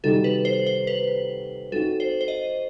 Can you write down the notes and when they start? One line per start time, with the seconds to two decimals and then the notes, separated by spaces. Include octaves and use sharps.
0.03 C3 D#3 G3 D#4 F#4 A4
0.24 B4
0.45 C5
0.67 C5
0.87 B4
1.72 F#3 C4 D#4 F#4 A4
2.00 C5
2.21 C5
2.28 D#5